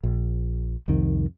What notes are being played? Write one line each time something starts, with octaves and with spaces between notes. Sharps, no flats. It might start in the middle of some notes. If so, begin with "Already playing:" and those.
A#1
C2 F2 D#3